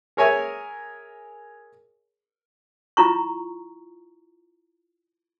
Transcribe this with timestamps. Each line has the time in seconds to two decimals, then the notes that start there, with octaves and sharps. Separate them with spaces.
0.17 G#4 A#4 C#5 E5 G#5
2.97 E4 F4 A#5 C#6